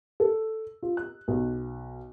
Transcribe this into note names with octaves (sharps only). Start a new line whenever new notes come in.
A4
F4
F#6
B1